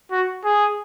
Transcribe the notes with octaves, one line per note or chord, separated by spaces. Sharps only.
F#4
G#4